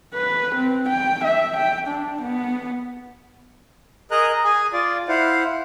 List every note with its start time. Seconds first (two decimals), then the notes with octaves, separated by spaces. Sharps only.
0.14 B4
0.55 C4
0.89 G5
1.24 E5
1.57 G5
1.88 D4
2.22 B3
4.11 G#4 A#4 D#5 A#5 F#6
4.44 G#4 G#5
4.73 F4 D5
5.09 E4 C5 F5 F#5